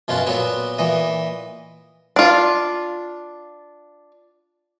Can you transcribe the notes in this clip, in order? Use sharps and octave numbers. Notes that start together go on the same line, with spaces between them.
F#2 B2 C#4 F4 F#4
A#2 F#3 B3 F#4
A#2 E3 D#5
D4 F4